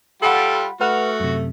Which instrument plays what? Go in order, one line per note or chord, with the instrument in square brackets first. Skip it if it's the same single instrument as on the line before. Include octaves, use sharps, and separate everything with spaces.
[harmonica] G3 F4 G4 [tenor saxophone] A4 [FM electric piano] F#5 B5
[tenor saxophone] A3 [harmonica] F#4 [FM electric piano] B4 F#5 F6
[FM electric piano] F#2 C3